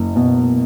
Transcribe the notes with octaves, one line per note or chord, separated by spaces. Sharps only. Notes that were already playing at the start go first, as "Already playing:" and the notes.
Already playing: F#1
B2